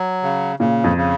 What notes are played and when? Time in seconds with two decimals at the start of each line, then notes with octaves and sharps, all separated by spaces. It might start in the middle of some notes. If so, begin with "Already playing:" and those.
Already playing: F#3
0.23 C#3
0.59 A#2 C#3
0.84 F2
0.97 C#3